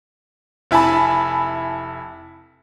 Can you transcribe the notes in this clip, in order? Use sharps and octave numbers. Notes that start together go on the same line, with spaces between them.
F1 E4 G#5 A5 B5